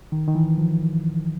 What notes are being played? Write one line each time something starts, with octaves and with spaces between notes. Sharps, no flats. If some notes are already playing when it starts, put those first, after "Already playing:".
D#3
D#3
E3
F3